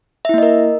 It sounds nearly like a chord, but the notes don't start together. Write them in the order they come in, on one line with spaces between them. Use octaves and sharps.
E5 E4 A#3 D#5 A#4